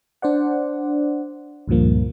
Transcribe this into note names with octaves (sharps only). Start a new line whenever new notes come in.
D4 C5 D5 F#5
C#2 G2 A#2 F3 A#3